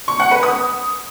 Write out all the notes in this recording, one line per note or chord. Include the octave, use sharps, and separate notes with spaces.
C#6
F#5
B4
D#6